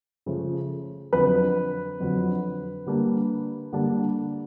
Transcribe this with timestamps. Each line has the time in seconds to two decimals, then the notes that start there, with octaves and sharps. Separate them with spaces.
0.26 C#3 F3 A3
1.13 F2 D3 F#3 B4
2.00 F2 D3 F#3
2.86 D3 G3 A#3 D4
3.73 D3 G3 A#3 D4